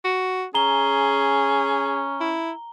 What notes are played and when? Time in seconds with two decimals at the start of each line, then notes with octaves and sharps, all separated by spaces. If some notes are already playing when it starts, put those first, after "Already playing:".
0.05 F#4
0.55 C#4 G#4 A#5 G7
2.20 E4